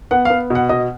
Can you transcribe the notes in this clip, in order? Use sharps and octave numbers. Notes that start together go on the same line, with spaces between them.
B3 F#5
B3 F5
B2 F#5
B2 D#5